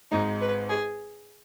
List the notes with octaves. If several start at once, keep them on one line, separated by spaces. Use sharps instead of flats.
G#1 G#2 G#3 D#4
B4
G#4